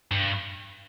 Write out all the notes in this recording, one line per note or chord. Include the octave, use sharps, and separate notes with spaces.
G2